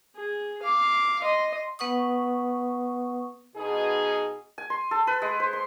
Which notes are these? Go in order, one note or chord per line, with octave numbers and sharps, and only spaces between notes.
G#4
F5 D6
D#5 C6
B3 B4 F#5 C#6 D#6
B2 D#4 G#4
G#5
C6
A4
B4
G#3
C5
C6